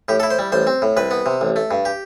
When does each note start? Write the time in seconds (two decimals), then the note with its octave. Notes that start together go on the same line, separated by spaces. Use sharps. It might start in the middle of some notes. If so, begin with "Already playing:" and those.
0.08 A2 G4
0.20 A4
0.23 E4
0.31 C5
0.39 G3
0.52 A1 C5
0.67 C4
0.82 A2
0.97 C2 B4
1.11 B3
1.26 C3
1.41 A1
1.56 A3
1.71 G2
1.85 G4